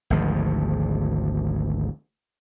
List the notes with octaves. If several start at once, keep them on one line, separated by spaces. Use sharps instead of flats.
G#1 D2 F3